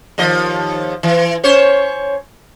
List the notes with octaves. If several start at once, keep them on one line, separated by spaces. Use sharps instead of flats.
D#2 F3 D#5
E3
C#4 C5 C#5